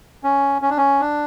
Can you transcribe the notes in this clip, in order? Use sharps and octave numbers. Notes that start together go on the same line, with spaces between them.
C#4
C#4
D4
C#4
D4